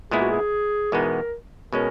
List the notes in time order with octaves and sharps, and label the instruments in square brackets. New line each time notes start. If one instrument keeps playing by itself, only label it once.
[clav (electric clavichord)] A#2 G#3 B3 E4 [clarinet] G#4
[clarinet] F#4
G#4
[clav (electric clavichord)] E2 B2 G#3 B3 D#4 [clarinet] A#4
[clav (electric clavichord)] B2 G#3 C#4 [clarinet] A#4